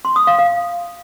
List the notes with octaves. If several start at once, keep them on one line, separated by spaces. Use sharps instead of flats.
C6
D#6
F5
F5